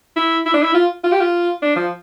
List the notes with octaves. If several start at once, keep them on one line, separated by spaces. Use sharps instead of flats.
E4
E4
D4
E4
F4
F4
G4
F4
D4
F3